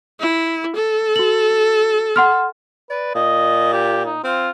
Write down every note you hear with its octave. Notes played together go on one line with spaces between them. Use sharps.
E4
A4
F#4 F#7
F#5 C6 F6
B4 D5
A#2 D#5
G4
D#4
C4 F4